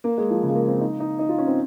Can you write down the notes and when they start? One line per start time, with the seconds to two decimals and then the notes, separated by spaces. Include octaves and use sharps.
0.04 A#3
0.18 G#3
0.30 F3
0.43 C#3
0.49 G#3
0.55 A#3
0.68 C4
0.81 D#4
1.00 D#4
1.19 D#4
1.29 F4
1.38 C#4
1.47 C4